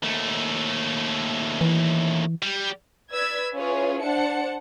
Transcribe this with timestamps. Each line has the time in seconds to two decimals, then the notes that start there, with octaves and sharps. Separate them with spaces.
0.03 D#2 A3
1.61 E3
2.43 G3
3.10 B4 D5 E6 G#6 B6
3.56 C#4 E4 F4 G#4 B4 C#5
4.02 D4 C5 F#5 A5 C#7